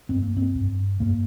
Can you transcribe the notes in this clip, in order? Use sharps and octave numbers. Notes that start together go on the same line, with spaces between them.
G2 C4
A#3
C4
G2
G2 A#3